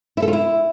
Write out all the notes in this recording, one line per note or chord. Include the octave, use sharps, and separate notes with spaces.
E4
A4
F4
E4